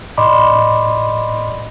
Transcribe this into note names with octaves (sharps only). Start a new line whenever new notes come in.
A2 D5 D#5 B5 C6 D6